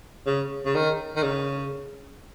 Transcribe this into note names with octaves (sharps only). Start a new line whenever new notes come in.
C#3
C#3
D#3
D#3
C#3